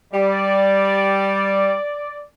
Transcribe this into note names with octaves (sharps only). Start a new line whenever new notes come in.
G3 D5